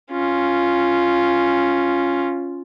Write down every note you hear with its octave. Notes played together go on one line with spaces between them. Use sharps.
C#4 F4